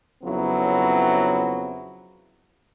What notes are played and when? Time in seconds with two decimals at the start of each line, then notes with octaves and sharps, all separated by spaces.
0.24 F2 C#3 F#3 B3 C4 E4